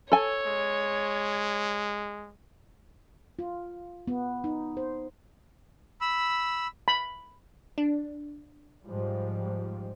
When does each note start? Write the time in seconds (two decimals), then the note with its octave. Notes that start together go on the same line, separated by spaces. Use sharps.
0.12 A4 C#5 G#5
0.46 G#3
3.39 F4
4.07 B3
4.44 D#4
4.77 C5
6.01 B5 E6
6.88 B5
7.78 D4
8.86 G#2 F3 G3